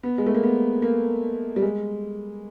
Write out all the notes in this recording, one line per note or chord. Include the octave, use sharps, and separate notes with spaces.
B3
G#3
A3
A#3
B3
A#3
G3
G#3